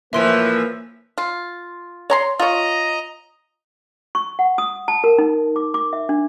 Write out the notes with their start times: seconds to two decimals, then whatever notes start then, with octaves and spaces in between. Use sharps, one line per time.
0.13 A2 E3 F3 A#3 B4 E5 C6 D7
1.18 F4
2.10 C#5 A#5 C6
2.39 F4 C#5 D#5 A#5
4.15 C#6
4.39 F#5
4.58 D#6
4.88 A5
5.04 A#4
5.19 D#4
5.56 D6
5.74 D6
5.93 E5
6.09 D4